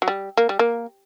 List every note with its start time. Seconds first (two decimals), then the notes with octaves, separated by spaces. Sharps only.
0.02 F#3
0.08 G3
0.37 A#3
0.49 G3
0.59 A#3